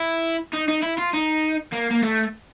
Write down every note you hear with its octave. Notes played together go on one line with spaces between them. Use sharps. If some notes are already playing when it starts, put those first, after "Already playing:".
Already playing: E4
D#4
D#4
E4
F4
D#4
A#3
A#3
A3